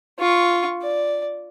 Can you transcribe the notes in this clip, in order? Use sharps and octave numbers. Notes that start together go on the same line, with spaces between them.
F4 C#6
D5